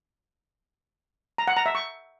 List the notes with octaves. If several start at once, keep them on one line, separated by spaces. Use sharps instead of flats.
A#5
F#5
A#5
E5
C#6